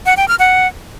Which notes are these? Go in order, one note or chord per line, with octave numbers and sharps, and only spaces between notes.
F#5
G5
F6
F#5